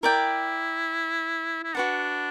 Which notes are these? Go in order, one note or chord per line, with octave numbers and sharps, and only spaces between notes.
E4 A#4 D5 G5
E4
D4 F#4 B4 F#5